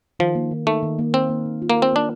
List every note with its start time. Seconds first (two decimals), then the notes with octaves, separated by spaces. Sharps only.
0.19 D#3 F3
0.35 A#3
0.51 D#3
0.67 A3 D#4
0.83 D#3
0.99 A#3
1.14 C4 A#4
1.29 A#3
1.46 D#3
1.62 F4
1.70 A#3
1.76 A#4
1.82 C4
1.93 A#3 D4